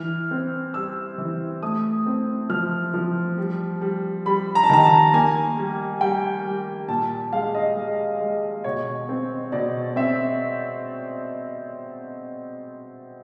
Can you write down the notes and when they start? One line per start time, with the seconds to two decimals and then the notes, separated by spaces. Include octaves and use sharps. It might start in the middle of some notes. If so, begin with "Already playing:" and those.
Already playing: E3 F6
0.31 C4
0.74 G3 E6
1.18 E3
1.63 A3 D#6
2.06 C4
2.49 F3 F6
2.94 F3
3.38 G3
3.81 G3
4.26 G3 B5
4.55 A#5
4.63 A5
4.69 D#3 A#5
4.83 A5
5.13 A#3 G#5
5.57 G3
6.01 G3 G5
6.45 G3
6.89 A#2 A5
7.33 G#3 F5
7.55 D#5
7.76 G#3
8.20 G#3
8.64 B2 C#5
9.09 C4
9.52 B2 D5
9.96 C4 E5